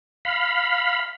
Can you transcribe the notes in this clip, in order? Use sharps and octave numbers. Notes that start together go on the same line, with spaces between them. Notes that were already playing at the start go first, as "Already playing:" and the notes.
F5 B5